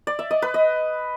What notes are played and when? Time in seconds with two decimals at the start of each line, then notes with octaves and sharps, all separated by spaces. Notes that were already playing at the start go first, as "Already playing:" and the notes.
0.07 D5
0.19 E5
0.31 D#5
0.42 B4
0.54 D#5